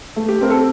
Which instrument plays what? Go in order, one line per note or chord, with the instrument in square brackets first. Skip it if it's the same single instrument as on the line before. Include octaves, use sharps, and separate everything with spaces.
[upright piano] A3
G4
C4 A#4
A4